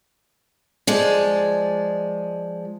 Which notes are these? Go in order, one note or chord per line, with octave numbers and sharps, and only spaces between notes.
F3 G#3 D5